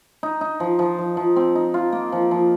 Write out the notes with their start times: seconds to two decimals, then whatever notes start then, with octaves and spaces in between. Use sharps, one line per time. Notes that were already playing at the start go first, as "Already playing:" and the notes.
0.23 D#4
0.41 D#4
0.60 F3
0.79 F3
0.98 F3
1.17 F3
1.36 C4
1.55 D#4
1.74 F4
1.92 A#3
2.12 F3
2.31 F3